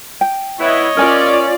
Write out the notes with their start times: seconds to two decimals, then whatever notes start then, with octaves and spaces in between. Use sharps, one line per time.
0.21 G5
0.60 B3 E4 C#5 D#5
0.97 C#4 F4 A#4 D5 G#5